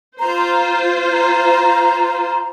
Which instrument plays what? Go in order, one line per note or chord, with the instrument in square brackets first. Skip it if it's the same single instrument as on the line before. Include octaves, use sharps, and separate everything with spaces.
[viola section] F4 C5 [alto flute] A#5
[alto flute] A#5